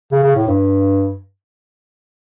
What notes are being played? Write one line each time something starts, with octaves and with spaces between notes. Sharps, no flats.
C#3
C#3
A2
G2